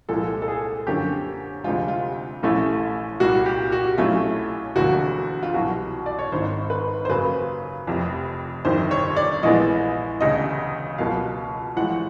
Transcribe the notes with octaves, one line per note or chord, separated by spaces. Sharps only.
C2 A#2 F3 G#3 A4
A4
G#4
F#2 D3 F3 A#3 C#4 G4
D2 C3 F3 G#3 F4
F4
A#1 A2 E3 A3 C#4
C2 A#2 G3 F#4
G4
F#4
B1 A2 F#3 A3 C#4 F4
E1 D2 D3 F3 A#3 F#4
F4
C2 B2 F#3 F#4
D5
C#5
G#1 G#2 D#3 C5
B4
C5
F#2 C#3 F#3 A#3 B4
F1 F2 C3
G1 F2 C3 D#3 C5
C#5
D5
A#1 A2 E3 G#3 B3 D#5
E1 D2 C#3 D#5
C#2 B2 F#3 A#3 F5
A1 A2 F3 G#3 F#5